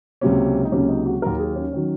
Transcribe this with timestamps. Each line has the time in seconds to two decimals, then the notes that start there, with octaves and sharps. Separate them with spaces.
0.21 C#2 C3 F#3 A#3 C#4
0.65 D#4
0.72 C#2 C3 F#3 A#3 C#4
0.89 D#4
1.06 F#4
1.22 D#2 D#3 F#3 A#4
1.39 G#4
1.56 C#4
1.73 D#3 F#3 C#4